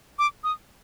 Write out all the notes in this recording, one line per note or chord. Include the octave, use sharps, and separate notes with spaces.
D6
D#6